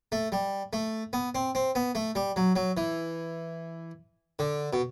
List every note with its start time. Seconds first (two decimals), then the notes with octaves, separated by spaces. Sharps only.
0.12 A3
0.32 G3
0.73 A3
1.13 B3
1.35 C4
1.55 C4
1.75 B3
1.95 A3
2.15 G3
2.36 F#3
2.56 F#3
2.77 E3
4.39 D3
4.73 B2